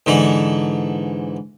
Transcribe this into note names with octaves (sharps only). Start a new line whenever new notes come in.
G#2 D3 E3